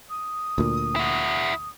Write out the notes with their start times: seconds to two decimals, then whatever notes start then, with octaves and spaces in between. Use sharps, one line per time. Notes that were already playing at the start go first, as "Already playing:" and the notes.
0.09 D#6
0.58 D2 A#2
0.96 E4 F#4